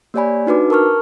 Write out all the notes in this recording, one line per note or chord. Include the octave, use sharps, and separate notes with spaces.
A#3 G4 C#5 D5 G#5 B5
D4 D#4 F#4 B4 D6
A#4 A5 C#6 F6